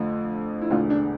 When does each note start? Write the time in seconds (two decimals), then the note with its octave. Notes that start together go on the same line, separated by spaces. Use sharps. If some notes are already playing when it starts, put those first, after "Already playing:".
Already playing: F2 D3 F3 A3
0.61 E4
0.70 E1 D2 D3 A3 F4
0.90 D4